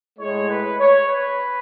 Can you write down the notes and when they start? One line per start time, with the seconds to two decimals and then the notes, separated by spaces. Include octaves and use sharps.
0.19 A2 G#3 C#5
0.49 B4
0.79 C#5
1.08 B4